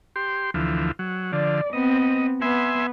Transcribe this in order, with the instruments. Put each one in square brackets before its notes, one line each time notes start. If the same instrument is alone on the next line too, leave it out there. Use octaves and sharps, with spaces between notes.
[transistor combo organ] G4 C6
D2 E3 F3
F#3
[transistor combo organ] D3 F3 [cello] D5
[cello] B3 C4 [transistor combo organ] D#5
[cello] B3 [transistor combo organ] E5 G#5 C6